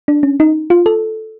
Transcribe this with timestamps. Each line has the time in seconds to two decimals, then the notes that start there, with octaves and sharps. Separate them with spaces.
0.08 D4
0.23 C#4
0.40 D#4
0.70 F4
0.86 A4